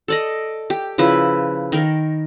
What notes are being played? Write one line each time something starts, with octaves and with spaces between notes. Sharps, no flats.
A4 D5 D#5
G4
C#3 F3 E4 B4
D#3 A#4